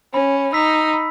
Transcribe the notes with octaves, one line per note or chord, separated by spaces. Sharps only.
C#4 B5
D#4 E6 B6
B5